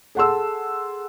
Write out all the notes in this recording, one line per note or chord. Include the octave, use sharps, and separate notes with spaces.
G#4 A4 F#5 A5 C6 E6